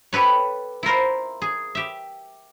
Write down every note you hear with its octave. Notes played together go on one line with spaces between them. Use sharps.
G4 A4 B4 C#5
E4 F4 A#4 C5
G#4
G4 E5